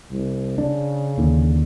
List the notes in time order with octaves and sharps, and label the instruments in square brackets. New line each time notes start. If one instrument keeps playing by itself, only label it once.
[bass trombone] C2
[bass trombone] C#3 [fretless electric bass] D4
[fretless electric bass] D#2 D3